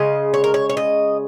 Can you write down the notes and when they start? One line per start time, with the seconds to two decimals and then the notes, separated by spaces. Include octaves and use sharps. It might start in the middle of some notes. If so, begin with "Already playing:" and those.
Already playing: C#3 G#3 D#5
0.34 C#5
0.44 A#4
0.54 C#5
0.69 C#5
0.77 D#5